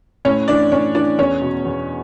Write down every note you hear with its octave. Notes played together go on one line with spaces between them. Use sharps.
A2 C#4 C#5
E3 D4 D5
A2 C#4 C#5
E3 D4 D5
E2 C#4 C#5
B2
E2